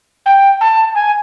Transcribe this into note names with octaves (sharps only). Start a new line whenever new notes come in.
G5
A5
G#5